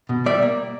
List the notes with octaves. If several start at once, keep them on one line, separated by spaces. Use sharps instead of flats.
B2
G3 D5 E5
A#3